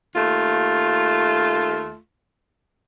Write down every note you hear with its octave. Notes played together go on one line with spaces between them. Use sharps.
D#2 A3 F4